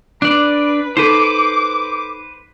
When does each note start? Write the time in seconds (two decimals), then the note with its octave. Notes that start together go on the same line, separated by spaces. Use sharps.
0.22 D4 B4 D5
0.97 D#4 A4 B4 C5 D6